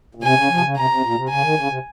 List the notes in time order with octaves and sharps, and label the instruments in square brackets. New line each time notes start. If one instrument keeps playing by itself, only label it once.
[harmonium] A#2
[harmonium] C3 [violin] G#5
[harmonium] C#3
F3
C3
C#3
[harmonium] C3 [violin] A#5
[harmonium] C3
A#2
C3
[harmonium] C#3 [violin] G#5
[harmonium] D#3
C#3
C3